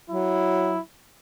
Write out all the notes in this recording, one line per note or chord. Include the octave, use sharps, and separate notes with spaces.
F#3 E4